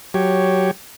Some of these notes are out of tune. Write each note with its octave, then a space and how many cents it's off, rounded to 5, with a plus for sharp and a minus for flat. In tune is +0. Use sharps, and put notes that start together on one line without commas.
F#3 +0 G4 +0 C#5 +0